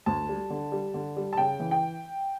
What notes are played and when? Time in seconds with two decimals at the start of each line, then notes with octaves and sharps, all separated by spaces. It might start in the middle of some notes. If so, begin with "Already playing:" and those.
0.06 D2 A5
0.29 G3
0.50 D3
0.72 G3
0.94 D3
1.16 G3
1.33 A5
1.38 C#3 G5
1.60 E3
1.71 G5